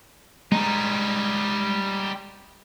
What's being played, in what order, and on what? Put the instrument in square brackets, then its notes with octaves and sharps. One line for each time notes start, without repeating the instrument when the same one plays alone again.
[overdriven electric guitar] G3 D#4 [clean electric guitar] G#3 A#5